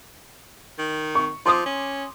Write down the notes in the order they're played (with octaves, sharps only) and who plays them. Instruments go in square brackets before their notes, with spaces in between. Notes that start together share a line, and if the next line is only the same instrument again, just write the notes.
[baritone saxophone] D#3
[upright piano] C#6
[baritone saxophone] F3 [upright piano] C6 D6 D#6
[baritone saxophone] C#4